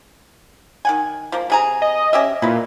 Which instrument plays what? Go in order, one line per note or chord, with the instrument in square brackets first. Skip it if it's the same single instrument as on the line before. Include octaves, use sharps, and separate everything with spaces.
[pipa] D#3 F#5 G#5
F3 A#3
C3 G#4 A#5
[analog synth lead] D#5
[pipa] C#4 G4 E5
[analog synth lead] A#2 [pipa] E4 B4